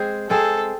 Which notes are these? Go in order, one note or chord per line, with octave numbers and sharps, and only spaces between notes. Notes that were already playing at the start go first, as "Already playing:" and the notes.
Already playing: G#3 C4 G#4 C5
G#3 C4 G#4 A4 C5